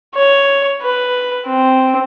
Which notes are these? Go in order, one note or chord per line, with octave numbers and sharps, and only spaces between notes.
C#5
B4
C4